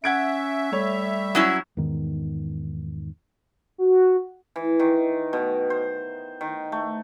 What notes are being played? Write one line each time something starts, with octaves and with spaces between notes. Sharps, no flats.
C#4 E5 F#5 G#6 D7
G3 A3 C#5
F#3 C#4 E4
E2 G#2 D#3
F#4
E3
D#3
B2
C5
D#3
A3